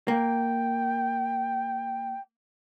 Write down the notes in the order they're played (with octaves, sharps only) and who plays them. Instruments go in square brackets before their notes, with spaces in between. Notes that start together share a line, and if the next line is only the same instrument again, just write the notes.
[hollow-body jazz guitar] A#3 [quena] G5